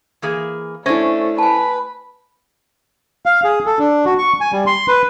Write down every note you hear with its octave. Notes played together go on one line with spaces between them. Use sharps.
E3 A#3 G#4
A3 C#4 D4 E4 C5 E5 G#5
B4 G#5 A5
F5
G#4
A4
D4
F#4
C#6
G#5
G3
C6
B4